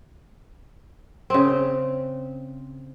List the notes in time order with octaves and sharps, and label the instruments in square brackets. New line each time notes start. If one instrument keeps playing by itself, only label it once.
[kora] C#3 C4